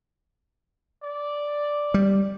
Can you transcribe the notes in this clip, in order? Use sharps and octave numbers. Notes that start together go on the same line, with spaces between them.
D5
G3